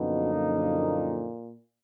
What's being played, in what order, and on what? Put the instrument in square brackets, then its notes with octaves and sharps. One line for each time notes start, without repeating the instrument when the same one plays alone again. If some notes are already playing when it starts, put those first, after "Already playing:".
Already playing: [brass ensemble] F#2 D3 F3 A#3 D#4 [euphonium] B2
[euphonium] A#2